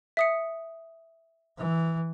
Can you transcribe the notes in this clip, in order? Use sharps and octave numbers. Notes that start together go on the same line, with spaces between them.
E5 D#6 C#7
E3